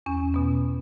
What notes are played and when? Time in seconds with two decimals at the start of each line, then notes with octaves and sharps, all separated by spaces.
0.06 E2 C#4
0.34 B2 B3